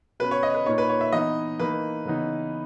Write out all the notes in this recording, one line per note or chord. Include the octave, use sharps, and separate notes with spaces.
B2 F#3 C#4 B4
C#5
D#5
B4
A#2 A#3 D#4 C#5
B4
C#5
E5
E3 B3 D#4 D#5
E3 A#3 D#4 B4
C#3 E3 B3 D#4